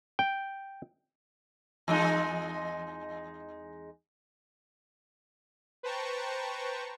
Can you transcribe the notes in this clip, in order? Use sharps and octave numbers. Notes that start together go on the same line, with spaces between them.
G5
E2 G#3 D#4
B4 C5 G5 A5 A#5 C#6